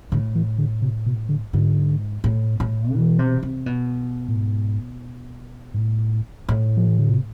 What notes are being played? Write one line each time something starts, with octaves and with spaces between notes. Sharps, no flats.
A2 D3
E3
D3
C3
B2
D3
G#2 D3
A2
A2
B2 E3
C3
C3
B2
A2
G#2
G#2
A2
A2
F3
E3
D3
C3